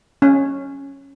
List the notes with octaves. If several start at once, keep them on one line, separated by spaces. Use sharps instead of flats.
C#4